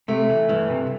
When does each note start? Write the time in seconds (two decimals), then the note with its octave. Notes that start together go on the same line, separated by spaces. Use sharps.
0.08 C3 A3
0.29 E3
0.49 G2 E3
0.70 C3